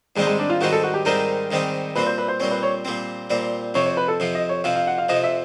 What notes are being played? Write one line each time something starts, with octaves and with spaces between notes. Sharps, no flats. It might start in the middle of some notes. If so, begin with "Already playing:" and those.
G#2 D#3 G3 G#3 C4 D#4
G#3
D4
F4
G#2 D#3 G3 C4 D#4 F#4
A4
F#4
G4
G#2 D#3 G3 C4 D#4 A#4
G#2 D#3 G3 C4 D#4
A#2 G3 C4 B4
C5
B4
C5
A#2 G3 C4 C#5
B4
C#5
A#2 G3 C4
A#2 G3 C4
F2 C3 F3 C#5
C#5
B4
A4
F2 C3 F3
D#5
C#5
F2 C3 F3 F5
F5
F#5
F5
F2 C3 F3 D#5
E5